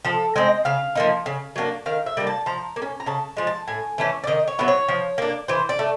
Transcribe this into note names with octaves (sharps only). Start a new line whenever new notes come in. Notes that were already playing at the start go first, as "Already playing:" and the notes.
F3 A4
G#3 C4 D#5
C#3 F5
F3 A#3 D#4
C#3
F#3 A#3 D4
D#3 F5
E5
G3 A#3 D4
A5
F3 A#5
A#3
C#4
A#5
C#3 A5
F3 G#3
A5
A2 G#5
E3 A3 C#4
D5
D#3 D#5
C#5
F#3 B3 E4
C#5
F3
A#3 D4
E3 C5
D5
A3